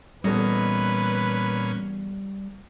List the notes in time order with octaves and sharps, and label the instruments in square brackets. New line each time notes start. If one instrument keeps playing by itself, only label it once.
[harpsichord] E2 A4 D#5 [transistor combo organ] A#2 C#4 [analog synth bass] G3 [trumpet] B4